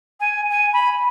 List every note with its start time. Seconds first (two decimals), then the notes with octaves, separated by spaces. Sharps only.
0.20 G#5
0.50 G#5
0.73 B5